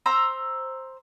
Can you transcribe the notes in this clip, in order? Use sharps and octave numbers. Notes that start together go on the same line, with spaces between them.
C5 A#5 E6